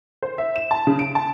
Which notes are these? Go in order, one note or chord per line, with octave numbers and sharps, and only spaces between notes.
C5
E5
E7
A5
C#3
D7
A5